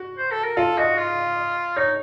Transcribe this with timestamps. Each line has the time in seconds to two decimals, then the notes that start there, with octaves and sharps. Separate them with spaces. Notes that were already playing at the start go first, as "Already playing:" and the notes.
Already playing: F#4
0.18 C5
0.31 A4
0.44 A#4
0.57 F4 A4
0.77 F#4 D#5
0.98 F4
1.77 D#4 C#5